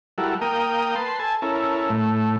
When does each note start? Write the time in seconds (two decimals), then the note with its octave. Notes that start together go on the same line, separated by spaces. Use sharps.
0.18 G3 E4 F#4 A4 A#4
0.41 A#3 A#4 G5 D#6
0.96 B4 A5 C6
1.19 A4 G#5 A5
1.42 C#4 E4 A4 A#4
1.90 A2 A3